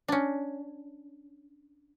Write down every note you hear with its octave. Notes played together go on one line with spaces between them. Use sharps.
C#4 D4